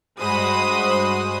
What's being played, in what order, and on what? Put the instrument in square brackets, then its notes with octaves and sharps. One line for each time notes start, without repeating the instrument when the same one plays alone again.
[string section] G2 G#3 F#4 C5 B5 D#6